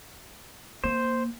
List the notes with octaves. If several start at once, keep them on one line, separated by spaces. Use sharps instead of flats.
A#3 C5